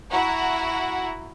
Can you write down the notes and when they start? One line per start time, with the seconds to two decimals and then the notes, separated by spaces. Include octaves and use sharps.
0.10 E4 F#4 F#5 A#5